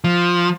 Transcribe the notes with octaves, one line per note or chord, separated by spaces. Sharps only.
F3